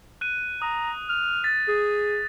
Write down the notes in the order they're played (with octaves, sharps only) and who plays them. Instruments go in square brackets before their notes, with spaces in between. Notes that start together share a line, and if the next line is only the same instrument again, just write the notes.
[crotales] F#6 D#7
[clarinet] A#5 [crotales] D#6
[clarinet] F6
[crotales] A6 B6
[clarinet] G#4